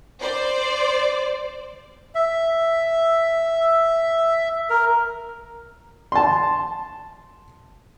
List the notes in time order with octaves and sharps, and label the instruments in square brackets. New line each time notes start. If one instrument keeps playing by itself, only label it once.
[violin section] C5 D5
[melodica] E5
A#4
[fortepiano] A5 C6